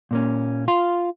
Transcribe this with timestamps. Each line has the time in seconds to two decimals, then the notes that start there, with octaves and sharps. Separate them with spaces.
0.11 A#2 A#3 C#4
0.68 F4 F5 C6